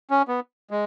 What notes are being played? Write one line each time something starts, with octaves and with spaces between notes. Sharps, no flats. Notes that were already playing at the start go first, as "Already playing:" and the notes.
C#4
B3
G#3